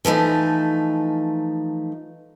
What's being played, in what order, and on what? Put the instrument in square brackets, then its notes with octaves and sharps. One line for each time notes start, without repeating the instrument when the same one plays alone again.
[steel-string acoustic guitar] E3 F3 A3 D#4